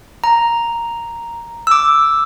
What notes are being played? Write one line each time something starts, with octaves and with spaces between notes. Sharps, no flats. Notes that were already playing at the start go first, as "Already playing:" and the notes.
A#5
D6 E6